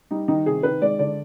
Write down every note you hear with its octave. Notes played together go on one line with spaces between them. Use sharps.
G3 D#4
D#3 D#4
C3 G#4
D#3 B4
G#3 D5
D3 D5